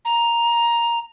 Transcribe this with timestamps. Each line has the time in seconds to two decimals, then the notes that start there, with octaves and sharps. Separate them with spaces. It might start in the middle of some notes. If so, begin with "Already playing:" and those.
0.05 A#5